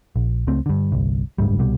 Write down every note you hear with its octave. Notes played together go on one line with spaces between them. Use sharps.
A#1
C#2 A3 C4
G2 D3
G1 C2
F#1 D2 G#2 G3
C2 B2 G3